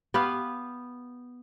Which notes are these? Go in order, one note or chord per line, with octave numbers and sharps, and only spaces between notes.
B3 G4 B4 F5